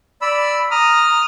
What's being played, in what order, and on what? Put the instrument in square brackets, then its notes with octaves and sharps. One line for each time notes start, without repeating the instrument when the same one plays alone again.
[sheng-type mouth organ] D5 B5 E6
[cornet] A#5 [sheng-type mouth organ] D#6 F6